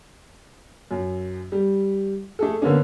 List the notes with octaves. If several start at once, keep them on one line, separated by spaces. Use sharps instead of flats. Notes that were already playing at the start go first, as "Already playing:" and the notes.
F#2
G3
A3 G#4 A4
D3 A#3 B3 C#4